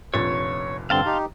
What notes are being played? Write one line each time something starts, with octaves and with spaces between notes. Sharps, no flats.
F1 A#1 C#5 A6
G2 D3 C4 F5 A5 C6
D#4 G4